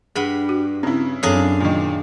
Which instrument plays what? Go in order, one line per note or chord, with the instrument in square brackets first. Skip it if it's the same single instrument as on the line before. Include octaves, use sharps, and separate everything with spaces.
[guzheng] G2 B5 [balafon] G#4 F#5
[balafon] F#4
[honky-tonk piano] C#3 E4 [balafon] C4
[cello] F#2 [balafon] C4 A4 C#5 [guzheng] D4 G#4 F5
[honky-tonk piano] A#2 D#3